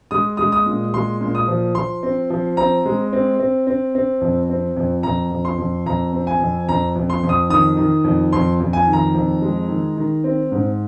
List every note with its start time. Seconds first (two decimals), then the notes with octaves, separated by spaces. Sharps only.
0.11 G#3 D#6
0.37 G#3 D#6
0.52 D#6
0.66 A#2
0.94 G#3 C6
1.21 A#2
1.35 D#6
1.48 F3
1.75 F3 C6
2.03 C4
2.30 F3
2.57 C4 A#5
2.86 G#3
3.13 C4
3.39 C4
3.67 C4
3.95 C4
4.21 F2
4.50 C4
4.77 F2
5.03 F2 A#5
5.31 F2
5.45 C6
5.58 F2
5.86 F2 A#5
6.13 C4
6.27 G#5
6.40 F2
6.69 F2 A#5
6.96 F2
7.10 C6
7.23 F2
7.29 D#6
7.50 D#3 D#6
7.77 D#3
8.04 F2
8.33 F2 C6
8.60 F2
8.73 G#5
8.86 D#3
8.93 A#5
9.15 F2
9.42 G#3
9.68 D#3
9.97 D#3
10.24 C4
10.52 G#2